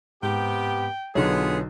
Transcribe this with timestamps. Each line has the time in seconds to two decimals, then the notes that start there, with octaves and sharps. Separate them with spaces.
0.23 G#2 C3 B3 G4 G5
1.15 B1 D3 B3 F4 G#4 C#5